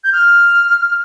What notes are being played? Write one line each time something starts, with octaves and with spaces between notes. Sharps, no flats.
G6
F6